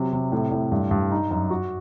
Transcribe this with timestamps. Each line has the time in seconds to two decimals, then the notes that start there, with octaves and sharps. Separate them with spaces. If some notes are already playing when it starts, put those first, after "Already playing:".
Already playing: C3 F#3
0.12 C3
0.32 A2
0.52 A2
0.72 G2
0.91 G2
1.12 D#4
1.31 F#2
1.50 F#4